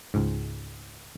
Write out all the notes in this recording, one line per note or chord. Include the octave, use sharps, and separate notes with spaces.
C#2 G#2